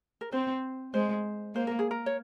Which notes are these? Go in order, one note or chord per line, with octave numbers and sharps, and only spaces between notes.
A#4
C4 C5
G#3 C5
A#3 C5
A#4
G#4
A#4
C#5